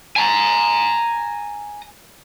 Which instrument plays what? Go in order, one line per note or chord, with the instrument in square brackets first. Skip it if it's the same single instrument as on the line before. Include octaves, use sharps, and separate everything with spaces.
[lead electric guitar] G#5 A#5